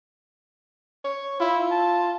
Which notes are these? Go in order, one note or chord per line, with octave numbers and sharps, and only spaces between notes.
C#5
E4 F4
A5